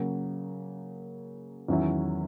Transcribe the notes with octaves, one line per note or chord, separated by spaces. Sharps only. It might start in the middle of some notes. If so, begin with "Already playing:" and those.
Already playing: C#3 F#3 A#3
E2 D#3 F#3 C#4 E4